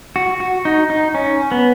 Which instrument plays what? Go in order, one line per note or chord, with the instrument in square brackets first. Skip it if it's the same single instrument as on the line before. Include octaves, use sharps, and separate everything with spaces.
[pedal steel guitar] F#4
F#4
D#4
D#4
C#4
B3